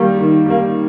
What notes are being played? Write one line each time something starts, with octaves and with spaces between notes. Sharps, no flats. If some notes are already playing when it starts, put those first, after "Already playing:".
Already playing: D#3 G3 A#3
D#3
G3 A#3